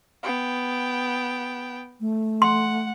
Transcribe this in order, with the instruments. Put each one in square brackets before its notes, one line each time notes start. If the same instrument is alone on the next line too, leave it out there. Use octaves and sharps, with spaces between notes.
[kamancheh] B3 G5
[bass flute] A3
[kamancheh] F#5 [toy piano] C6